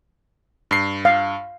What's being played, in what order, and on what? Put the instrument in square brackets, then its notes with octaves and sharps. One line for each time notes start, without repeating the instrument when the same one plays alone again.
[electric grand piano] G2 C7
[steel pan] F5